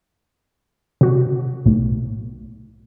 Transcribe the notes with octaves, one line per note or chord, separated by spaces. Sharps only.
C3 F#4
B1 A2